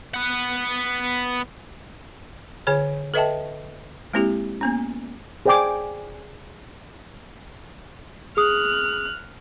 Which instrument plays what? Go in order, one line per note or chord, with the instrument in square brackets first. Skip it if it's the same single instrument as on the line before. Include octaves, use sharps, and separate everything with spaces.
[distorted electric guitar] B3 F#5
[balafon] D3 G#4 C#5 G#5
A4 B4 D#5 E5 G5 A5
G#3 A#3 C4 E4 G4
A#3 B3 C#4
[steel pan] G#4 C5 D5 G5 G#5 D6
[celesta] G#4 D#6 [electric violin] F6 F#6